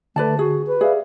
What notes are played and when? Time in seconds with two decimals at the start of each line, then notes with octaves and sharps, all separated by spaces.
0.16 D3 A3 B4 D5 A5
0.39 F#4 G#4
0.67 B4
0.81 G#4 D5 E5 F5